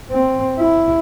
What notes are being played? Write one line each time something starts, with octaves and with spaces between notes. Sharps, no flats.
C4
E4